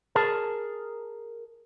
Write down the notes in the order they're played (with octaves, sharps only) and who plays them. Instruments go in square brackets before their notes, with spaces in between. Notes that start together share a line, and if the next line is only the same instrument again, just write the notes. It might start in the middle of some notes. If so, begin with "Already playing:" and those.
[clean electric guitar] G#4 A#4 A5